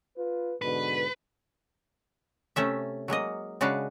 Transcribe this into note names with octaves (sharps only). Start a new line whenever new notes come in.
F4 B4
G#2 B2 D3 B4
C3 A3 C#4 E5
F#3 G#3 A#3 D#5
C#3 G#3 D4 F#4 B4 F5